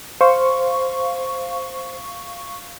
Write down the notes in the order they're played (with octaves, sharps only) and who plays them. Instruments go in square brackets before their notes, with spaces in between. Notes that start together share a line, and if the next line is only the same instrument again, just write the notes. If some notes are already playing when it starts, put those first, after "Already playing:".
[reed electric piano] C5 [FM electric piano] F5 C#6